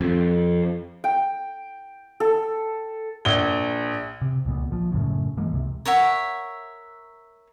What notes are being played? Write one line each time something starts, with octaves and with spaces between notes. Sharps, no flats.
F2
G5
A4
A#1 G7
C3
C#2 A#2 B3
A#1 F3
F#2 A2 C#3
G2 E3 G#3 A#3
C#2 C3
A#4 C#5 E5 F#5